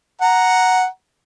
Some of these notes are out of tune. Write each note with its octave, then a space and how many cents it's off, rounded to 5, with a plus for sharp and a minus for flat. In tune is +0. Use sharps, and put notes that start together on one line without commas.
F#5 +0 A#5 +0